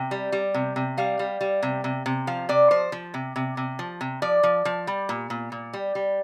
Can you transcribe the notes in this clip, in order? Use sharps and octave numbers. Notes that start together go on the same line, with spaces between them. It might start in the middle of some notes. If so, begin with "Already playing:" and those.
Already playing: C3 G5
G3
G3
C3
C3
G3 F5
G3
G3
C3
C3
C3
F3 F5
C3 D5
F3 C5
F3
C3
C3
C3
F3
C3
F3 D5
F3
F3
G3
A#2
A#2
A#2
G3
G3